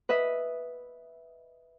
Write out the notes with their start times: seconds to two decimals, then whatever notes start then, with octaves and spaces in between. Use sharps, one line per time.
0.09 B4 D#5 E5